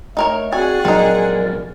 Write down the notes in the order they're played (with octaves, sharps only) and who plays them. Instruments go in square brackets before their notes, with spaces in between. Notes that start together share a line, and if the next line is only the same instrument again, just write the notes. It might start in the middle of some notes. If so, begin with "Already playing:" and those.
[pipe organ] A3 [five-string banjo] D#4 A#4 C#5
[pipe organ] C4 F#4 D5 [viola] G#4 F#5 [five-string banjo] G#5
[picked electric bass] A#1 C3 F#3 [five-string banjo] C4 D#4 [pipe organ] A#4 D5